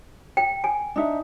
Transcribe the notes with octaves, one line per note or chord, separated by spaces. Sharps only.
G5
G#5
D4 D#4 E5